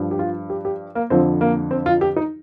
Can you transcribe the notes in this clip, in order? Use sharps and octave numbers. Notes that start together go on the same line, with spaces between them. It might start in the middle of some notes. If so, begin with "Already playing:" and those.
Already playing: G2 F3
G4
F4
G4
G4
A#3
F2 D3 F3 C4
A#3
C4
F4
G4
D#4